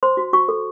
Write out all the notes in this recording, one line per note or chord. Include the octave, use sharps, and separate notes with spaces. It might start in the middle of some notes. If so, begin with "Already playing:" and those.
C5 C6
F#4
F#4 C#6
A4